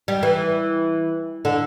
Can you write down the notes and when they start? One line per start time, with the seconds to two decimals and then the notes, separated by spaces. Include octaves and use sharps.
0.08 G3
0.23 E3
1.45 D3